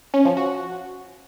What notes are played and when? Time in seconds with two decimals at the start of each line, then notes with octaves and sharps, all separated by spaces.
0.14 C#4
0.25 F3
0.37 F#4